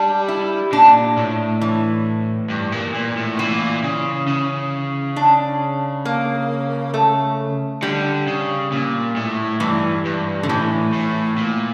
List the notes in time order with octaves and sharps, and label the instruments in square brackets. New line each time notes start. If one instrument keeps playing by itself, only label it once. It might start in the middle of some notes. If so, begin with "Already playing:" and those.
Already playing: [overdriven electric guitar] G3 [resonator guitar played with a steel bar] D4
[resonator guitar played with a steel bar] E4
[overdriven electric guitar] A#2 [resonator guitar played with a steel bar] D4
[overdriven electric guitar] A2
[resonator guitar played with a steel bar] E3
[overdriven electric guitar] G2
A#2
A#2
A2
[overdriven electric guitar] A#2 [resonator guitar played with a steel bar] E3
[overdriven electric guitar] C#3
C#3
[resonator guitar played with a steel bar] D4
A#3
A3
[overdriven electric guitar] D3 [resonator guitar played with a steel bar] G3
[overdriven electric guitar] C#3
A#2
A2
[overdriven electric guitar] G2 [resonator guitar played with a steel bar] E3
[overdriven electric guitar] G2
[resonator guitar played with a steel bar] D3
[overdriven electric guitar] A2 [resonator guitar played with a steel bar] E3
[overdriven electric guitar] A2
A#2